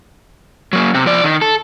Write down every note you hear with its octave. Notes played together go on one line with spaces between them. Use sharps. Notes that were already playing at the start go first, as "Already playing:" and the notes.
F#3 A#3
C3 C4
F3 D5
D#3
A4